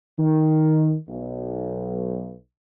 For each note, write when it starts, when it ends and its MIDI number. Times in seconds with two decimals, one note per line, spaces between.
0.19 0.96 51
1.09 2.33 35